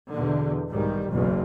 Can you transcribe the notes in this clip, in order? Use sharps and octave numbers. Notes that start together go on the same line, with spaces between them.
E2 B2 D3
B1 G#2 D#3 G3
F#1 B1 E2 B2